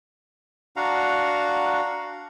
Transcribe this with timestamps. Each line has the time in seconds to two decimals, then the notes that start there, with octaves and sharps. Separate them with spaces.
0.77 D4 F#4 F5 F#5 A#5